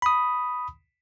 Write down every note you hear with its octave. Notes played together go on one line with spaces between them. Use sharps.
B5 D#6